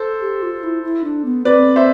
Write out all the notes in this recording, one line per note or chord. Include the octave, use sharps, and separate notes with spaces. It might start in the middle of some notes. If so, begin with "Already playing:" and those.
Already playing: A4 C5
G4
F4
E4
E4
D4
B3
C4 B4 D5
C5 E5